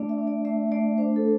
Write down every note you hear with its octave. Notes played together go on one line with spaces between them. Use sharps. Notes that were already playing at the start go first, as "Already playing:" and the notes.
Already playing: A3 D4 D5
E5
D4
D5
A3 E5
A3 D5
D4 C5
A4